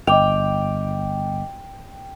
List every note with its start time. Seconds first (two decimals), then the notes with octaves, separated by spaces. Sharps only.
0.07 G1 D#5 G5 D6 F7